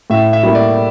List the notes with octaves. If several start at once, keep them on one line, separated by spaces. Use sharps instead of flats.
A2 E5
E5
G3 A#3 E4 G4
D5